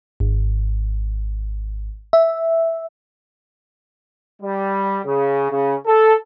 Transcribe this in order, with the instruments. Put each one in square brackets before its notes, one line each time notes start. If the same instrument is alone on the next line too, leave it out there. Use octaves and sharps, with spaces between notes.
[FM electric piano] G#1
E5
[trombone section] G3
C#3
C#3
A4